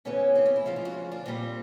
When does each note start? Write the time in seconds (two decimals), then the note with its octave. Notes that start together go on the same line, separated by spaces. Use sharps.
0.05 D2 C#3 E3 G3 B3 C#4
0.35 C4
0.45 C#4
0.56 E4
0.65 E2 C#3 F3 G#3 F4
0.76 F4
0.85 F#4
1.12 D4
1.26 A#2 G3 A#3 C4